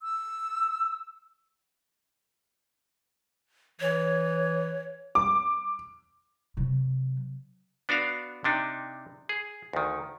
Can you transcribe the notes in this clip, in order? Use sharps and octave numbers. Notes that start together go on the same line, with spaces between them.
E6
E3 C#5
D6
C3 F#3
B3 D4 F#4 D5 F5
C3 D4 D#4
G#4
D2 D#3